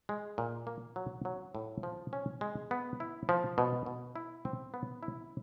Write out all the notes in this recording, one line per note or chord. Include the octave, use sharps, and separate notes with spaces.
G#3
A#2
A#3
F#3
F#3
A2
F3
C#4
G#3
B3
E4
F3
B2
B2
E4
C4
B3
E4